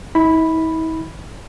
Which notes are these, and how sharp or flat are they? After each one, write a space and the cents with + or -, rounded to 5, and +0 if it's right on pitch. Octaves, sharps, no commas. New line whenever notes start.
E4 -45 B5 +0